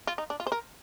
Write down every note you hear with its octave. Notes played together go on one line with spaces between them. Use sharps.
F4
D#4
D4
F4
C5
A#4